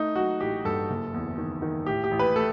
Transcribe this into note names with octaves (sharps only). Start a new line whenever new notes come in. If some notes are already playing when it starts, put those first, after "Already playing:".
Already playing: A3 D#4
F#3 F#4
A1 G4
G2 A4
F#1
E2
D#3
D#3
A2 G4
G4
A1
B4
A3 A4